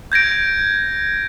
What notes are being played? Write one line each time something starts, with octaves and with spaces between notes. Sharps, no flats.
G6 G#6 A#6 D7